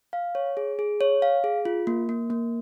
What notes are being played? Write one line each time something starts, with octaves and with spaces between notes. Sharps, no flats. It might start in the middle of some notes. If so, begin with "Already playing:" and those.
F5
C#5
G#4
G#4
C#5
F5
G#4
F4
A#3
A#3
A#3